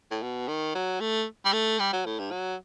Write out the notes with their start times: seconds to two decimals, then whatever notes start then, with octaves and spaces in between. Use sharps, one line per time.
0.11 A2
0.22 B2
0.48 D#3
0.75 F#3
1.00 A3
1.45 G3
1.53 A3
1.79 G3
1.93 F#3
2.05 A2
2.19 G2
2.31 F#3